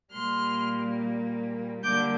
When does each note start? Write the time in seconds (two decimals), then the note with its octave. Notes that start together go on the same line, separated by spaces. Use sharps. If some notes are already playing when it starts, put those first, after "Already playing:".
0.13 A#2 G3 A#3 C6 F6
1.83 D3 G3 A#3 D6 G6